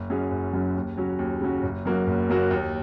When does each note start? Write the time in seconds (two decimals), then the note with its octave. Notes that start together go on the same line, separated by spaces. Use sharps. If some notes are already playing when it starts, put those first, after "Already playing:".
Already playing: F#1
0.10 F#2 F#3 C#4 G#4
0.31 F#1
0.53 F#2 F#3 C#4 G#4
0.75 D#2
0.97 C#3 F#3 C#4 F#4
1.19 D#2
1.41 C#3 F#3 C#4 F#4
1.63 F#1
1.86 F#2 F#3 A#3 F#4
2.07 F#1
2.29 F#2 F#3 A#3 F#4
2.50 D#2